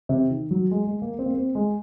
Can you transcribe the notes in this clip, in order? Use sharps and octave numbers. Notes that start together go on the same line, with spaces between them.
C3
D#3
F#3
G#3
G#3
A#3
C4
A#3
C4
G#3